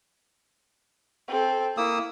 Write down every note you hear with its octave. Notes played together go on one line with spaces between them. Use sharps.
C4 A4
A#3 E4 D#6 E6